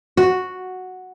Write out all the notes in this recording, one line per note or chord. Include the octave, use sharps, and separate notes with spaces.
F#4